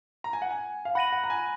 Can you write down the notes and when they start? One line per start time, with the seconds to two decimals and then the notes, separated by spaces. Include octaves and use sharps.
0.24 A#5
0.33 G#5
0.42 F#5
0.51 G#5
0.85 F5
0.95 F#5 B5 F#6 A#6 D#7 F#7
1.12 F#5
1.24 A#5
1.30 G#5